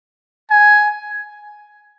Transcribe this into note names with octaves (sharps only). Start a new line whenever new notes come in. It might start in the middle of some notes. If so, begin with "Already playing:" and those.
G#5